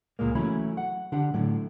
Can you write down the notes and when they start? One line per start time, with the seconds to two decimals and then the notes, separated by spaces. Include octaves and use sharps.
0.19 C#2 A#2 G#3 A#3
0.35 E3 F#3 A3 C#4 E4 B5
0.77 F#5
1.12 D3 D4 G4 F#5
1.34 A2 D3 F#3